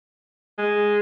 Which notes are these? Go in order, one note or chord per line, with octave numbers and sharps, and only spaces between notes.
G#3